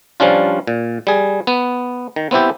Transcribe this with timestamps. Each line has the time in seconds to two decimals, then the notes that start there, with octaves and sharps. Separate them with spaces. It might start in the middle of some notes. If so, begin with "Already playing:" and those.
0.20 F3 G3 C#4 D4 F4
0.67 A#2
1.07 G3 G#4
1.47 B3
2.16 D#3
2.31 B3 C4 E4 G4